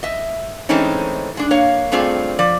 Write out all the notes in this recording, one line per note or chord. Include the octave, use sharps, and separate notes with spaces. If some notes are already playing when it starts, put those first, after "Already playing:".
D#5 E5
E3 G#3 A3 C4 C#4 D#4
G#3 D4
A#3 C#5 F5
G2 A3 C4 F4 G#4 D5
F3 D5